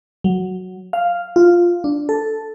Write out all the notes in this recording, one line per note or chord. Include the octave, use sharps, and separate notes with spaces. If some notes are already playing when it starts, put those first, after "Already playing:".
F#3
F5
F4
D4
A4